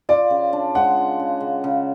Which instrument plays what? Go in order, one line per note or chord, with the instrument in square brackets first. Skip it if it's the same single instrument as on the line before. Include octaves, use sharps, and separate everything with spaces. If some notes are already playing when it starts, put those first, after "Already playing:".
[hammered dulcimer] F4 [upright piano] D5
[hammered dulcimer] C#3
D4
[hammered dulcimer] G#3 [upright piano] F#5
[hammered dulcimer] F4
C#3
C#3
C#3